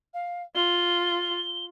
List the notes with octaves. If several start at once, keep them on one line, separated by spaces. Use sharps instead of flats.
F5
F4 G7